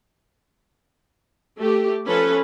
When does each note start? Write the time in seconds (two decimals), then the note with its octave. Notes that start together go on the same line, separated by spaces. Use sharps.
1.58 A3 G4
2.06 F3 C#4 A4 B4